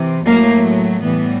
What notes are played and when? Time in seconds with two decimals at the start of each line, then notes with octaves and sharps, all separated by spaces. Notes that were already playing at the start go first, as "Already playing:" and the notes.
Already playing: C3 E3
0.26 A2 F#3 A3 A#3
1.03 A2 E3 G3 B3